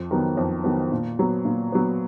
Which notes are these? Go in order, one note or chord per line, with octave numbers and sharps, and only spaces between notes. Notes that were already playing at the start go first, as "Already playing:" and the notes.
Already playing: F2
D#3 F#3 B3
F2
D#3 F#3 B3
A#2
F#3 B3
A#2
F#3 B3